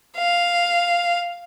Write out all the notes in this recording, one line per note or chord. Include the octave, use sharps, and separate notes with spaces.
F5